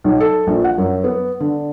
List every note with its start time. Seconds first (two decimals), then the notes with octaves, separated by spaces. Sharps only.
0.04 B1
0.20 A4
0.47 A#1
0.64 F#5
0.78 F#2
1.04 B3
1.40 D3